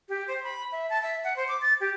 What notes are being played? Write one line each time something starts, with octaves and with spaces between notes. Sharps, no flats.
G4
C5
B5
E5
A5
E5
F#5
C5
D6
A6
G4